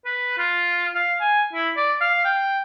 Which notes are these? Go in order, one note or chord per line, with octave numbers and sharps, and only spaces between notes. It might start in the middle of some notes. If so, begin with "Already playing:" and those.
B4
F4
F5
G#5
E4
D5
F5
G5